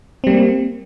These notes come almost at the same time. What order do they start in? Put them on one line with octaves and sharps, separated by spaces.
C4 G3 A#3